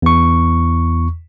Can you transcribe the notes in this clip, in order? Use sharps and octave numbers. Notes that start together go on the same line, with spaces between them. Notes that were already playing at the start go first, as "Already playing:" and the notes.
E2 C#6